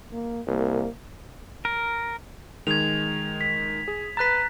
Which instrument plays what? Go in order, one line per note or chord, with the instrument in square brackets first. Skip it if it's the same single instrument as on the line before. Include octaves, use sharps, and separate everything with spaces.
[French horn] A#3
[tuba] C2 [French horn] A#3
[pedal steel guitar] A#4
[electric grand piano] D#3 G#3 [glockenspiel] G#6 F7
[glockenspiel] B6
[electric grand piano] G#4
[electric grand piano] B4 A6 [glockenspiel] A#5 F#6 B6